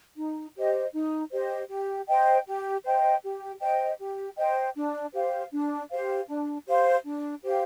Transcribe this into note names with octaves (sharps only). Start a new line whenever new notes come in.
D#4
G4 C5 D#5
D#4
G4 C5 D#5
G4
C5 D#5 G5
G4
C5 D#5 G5
G4
C5 D#5 G5
G4
C5 D#5 G5
D4
G4 C5 F5
D4
G4 C5 F5
D4
G4 C5 F5
D4
G4 C5 F5